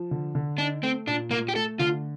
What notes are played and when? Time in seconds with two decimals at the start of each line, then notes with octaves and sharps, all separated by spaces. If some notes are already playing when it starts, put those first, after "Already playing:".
Already playing: F3
0.11 D3
0.35 D3
0.58 D4 D#4
0.83 A3 C4
1.07 A#2 D4
1.31 A#2 A#3
1.48 G4
1.55 A3 A4
1.79 D3 F4